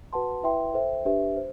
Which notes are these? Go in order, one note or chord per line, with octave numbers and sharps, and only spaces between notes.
F#4 B4 F#5 A5 C6
E4 B4 E5 G5 C6
A4 C5 E5 G5
D4 G4 B4 E5
C5